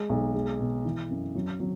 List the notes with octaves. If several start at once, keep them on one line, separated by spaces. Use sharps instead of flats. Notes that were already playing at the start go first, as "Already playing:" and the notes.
Already playing: G#3
B1
G#3
B2
E3
F#2
F#3
F#3